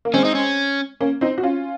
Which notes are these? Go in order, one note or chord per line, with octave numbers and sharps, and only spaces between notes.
A#3
G#3 C4 C#4
D#4
C#4
A#3 C#4
C4 D#4
F#4
C#4 F4